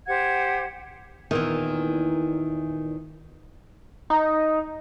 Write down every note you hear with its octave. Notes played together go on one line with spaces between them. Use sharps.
G4 C5 F#5 G#6
E2 A#2 D#3 E3
D#4